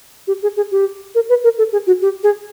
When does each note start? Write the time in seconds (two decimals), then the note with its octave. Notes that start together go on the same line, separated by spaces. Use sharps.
0.27 G4
0.42 G#4
0.57 G#4
0.71 G4
1.15 A#4
1.29 B4
1.44 A#4
1.58 A4
1.72 G#4
1.87 F#4
2.02 G4
2.23 G#4